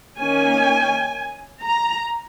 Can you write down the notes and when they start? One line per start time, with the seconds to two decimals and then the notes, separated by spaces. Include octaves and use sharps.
0.17 D#3 A#3 C#4 G#5
1.63 A#5